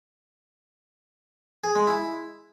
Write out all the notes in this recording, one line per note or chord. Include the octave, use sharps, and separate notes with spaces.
G#4
G#3
E4